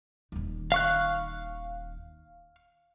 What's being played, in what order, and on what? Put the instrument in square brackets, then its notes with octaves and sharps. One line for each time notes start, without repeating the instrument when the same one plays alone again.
[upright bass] D#1 D#3
[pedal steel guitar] F5 C#6 F#6